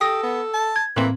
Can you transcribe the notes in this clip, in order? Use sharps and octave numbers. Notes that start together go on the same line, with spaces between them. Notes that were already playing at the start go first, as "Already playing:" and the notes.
G4 A4 D#6 A#6
B3
A5
G#6
A2 E3 A#3 C4 F#7